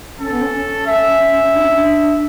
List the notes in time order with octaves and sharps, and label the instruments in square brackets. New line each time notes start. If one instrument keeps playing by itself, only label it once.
[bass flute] C#4 [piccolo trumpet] A4
[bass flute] B3
C#4
C#4
[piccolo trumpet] E5
[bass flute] D4
C#4
D4